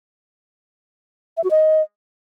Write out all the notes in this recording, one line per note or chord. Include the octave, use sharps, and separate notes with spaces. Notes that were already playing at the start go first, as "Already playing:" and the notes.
E5
F#4
D#5